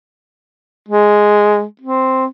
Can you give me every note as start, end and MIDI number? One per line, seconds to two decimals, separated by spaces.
0.89 1.63 56
1.81 2.25 60